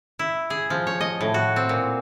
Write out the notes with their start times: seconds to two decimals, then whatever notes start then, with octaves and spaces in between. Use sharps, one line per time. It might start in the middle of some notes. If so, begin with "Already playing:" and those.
0.19 E4
0.50 G#4
0.70 F3
0.87 C#5
1.01 D#5
1.21 A2
1.34 F#4
1.56 C4
1.69 A#2